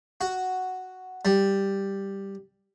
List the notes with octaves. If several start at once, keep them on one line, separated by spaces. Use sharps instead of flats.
F#4
G3